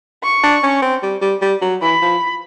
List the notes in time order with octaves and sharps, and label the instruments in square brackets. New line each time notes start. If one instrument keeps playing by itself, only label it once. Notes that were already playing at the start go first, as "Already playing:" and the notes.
[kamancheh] C#6
[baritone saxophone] D4
C#4
C4
G3
G3
G3
F#3
[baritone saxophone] E3 [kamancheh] B5
[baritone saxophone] F3